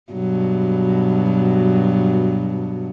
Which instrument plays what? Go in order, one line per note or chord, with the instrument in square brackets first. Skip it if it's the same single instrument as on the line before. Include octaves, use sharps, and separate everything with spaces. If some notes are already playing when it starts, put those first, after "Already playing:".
[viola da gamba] G2 B2 F#3